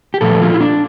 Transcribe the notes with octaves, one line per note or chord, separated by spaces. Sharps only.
G4
A#2 F3 A3 A4
F4
E4
D4